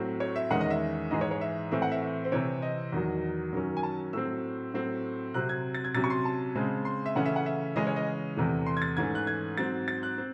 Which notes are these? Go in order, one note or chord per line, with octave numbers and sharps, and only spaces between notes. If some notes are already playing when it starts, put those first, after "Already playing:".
Already playing: A2 F#3 C4
C#5
E5
E2 D#3 G#3 C#4 F#5
D#5
E5
G#2 E3 G#3 D#5
C#5
C#5
E5
A2 E3 C4 E5
F#5
E5
E5
C5
C3 E3 C4 C#5
D#5
E2 D#3 F#3
F#2 D#3 F#3 C#4
G#5
A5
A2 F#3 C4 E6
A2 F#3 C4
C3 F#3 C4 F#6
G#6
A6
G#6
C3 F#3 C#4 A6
C#6
C6
A5
C#3 G#3 C4
C6
E5
C#3 E3 A3 C#4 F#5
E5
F#5
E5
C#3 E3 G#3 C#4 D#5
C#5
D#5
E2 C3 E3 A3
C6
G#6
A6
G#2 E3 A3 C#4 G#6
F#6
G#6
G#2 F#3 C4 A6
A6
F#6
C4